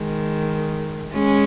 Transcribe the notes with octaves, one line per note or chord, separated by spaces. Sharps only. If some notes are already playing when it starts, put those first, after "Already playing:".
Already playing: D#3 G#3
G#3 C#4